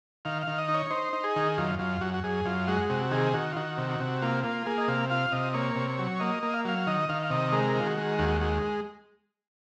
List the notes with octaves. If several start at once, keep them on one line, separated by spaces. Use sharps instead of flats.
D#3 F5
F5
D#3
D#5
D#4
C#5
D#4 C5
D#4
G#4
D#3
F#2 F4
F#2 F4
F#2 F#4
F#4
F#2 G#4
F#2 F4
G#3 F#4
C3 F#4
D#3 G#4
D#3 F#4
F4
D#3 F#4
C3
F#4
C3
A#3 F4
A#3 F4
A#3 G#4
D#5
C3 F5
F4 F5
C3 D#5
A#3 C#5
C3
F#3
A#3 D#5
A#3
F5
F#3 F5
D#3 D#5
D#3 F5
F5
C3 D#5
G#3 A#4
D#3 F4
F#4
G#3
D#2 F#4
G#3 F#4